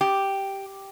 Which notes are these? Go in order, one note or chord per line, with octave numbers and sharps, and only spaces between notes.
G4